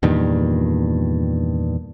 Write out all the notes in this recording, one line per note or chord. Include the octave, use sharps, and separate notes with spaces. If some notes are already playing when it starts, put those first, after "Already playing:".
E2 G2 A#2 D#3